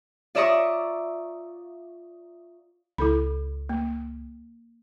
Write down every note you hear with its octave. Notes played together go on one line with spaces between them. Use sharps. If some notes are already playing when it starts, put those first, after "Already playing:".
F4 D5 E5 A#5 C#6 D#6
C#2 E4 A4 B5
A#3